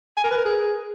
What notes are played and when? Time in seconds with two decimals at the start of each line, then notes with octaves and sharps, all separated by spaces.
0.17 G#5
0.24 A#4
0.31 B4
0.38 A#4
0.45 G#4